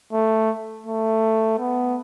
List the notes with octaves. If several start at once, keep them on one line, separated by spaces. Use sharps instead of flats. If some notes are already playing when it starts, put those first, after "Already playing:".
A3
A3
B3